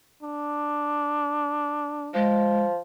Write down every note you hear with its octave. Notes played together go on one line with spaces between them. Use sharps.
D4
F3 G#3